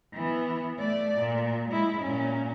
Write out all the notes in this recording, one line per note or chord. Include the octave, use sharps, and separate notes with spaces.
E3 B3
A3 D5
A#2
G#3 E4
A#2 C#4